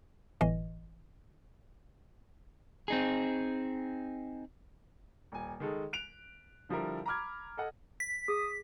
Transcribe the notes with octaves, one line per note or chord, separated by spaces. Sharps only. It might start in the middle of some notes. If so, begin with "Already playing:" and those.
G1 A2 E3 D#5
C4 D#4 G#4
D#1 G#5
D#3 G#3 A4
F#6 D7 F7
D3 F3 G3 E4 A#4
A#5 B5 D6 F6 G#6
A4 D#5 F#5
B6
G#4 D#6